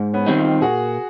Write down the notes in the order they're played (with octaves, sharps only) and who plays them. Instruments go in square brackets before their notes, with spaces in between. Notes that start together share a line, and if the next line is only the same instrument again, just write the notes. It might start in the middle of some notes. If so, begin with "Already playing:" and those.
Already playing: [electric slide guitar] G#2
[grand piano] B3 C#4
[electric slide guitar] D#3 G3 C4 D#4
[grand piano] F4 G4
[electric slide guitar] A#2 [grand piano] F#4 G#4